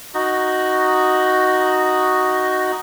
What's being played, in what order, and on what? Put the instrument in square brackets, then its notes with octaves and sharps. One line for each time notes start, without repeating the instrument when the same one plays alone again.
[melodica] D#4 F#4